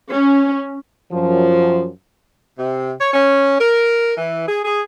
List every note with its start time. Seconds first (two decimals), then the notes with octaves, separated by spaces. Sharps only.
0.12 C#4
1.12 F#2 F3
2.58 C3
2.99 C#5
3.14 C#4
3.59 A#4
4.17 E3
4.48 G#4
4.65 G#4